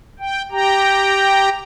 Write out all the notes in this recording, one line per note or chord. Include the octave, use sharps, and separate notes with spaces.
G5
G4 G5 A#5